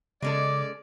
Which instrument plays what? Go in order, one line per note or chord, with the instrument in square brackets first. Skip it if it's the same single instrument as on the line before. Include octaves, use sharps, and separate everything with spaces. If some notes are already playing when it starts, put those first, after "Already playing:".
[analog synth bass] C#3 [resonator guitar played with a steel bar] G#3 C#4 A4 [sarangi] D5 [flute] D6